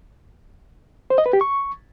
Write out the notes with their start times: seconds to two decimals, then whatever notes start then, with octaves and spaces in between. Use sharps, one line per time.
1.10 C5
1.18 D#5
1.26 B4
1.33 G4
1.41 C#6